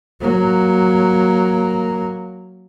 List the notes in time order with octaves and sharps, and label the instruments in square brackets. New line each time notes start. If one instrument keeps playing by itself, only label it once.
[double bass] F#3 A#3